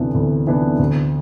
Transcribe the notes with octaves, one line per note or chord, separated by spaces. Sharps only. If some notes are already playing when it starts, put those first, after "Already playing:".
Already playing: D2 C3 E3 B3 D4
D2
C3 E3 B3 D4
D2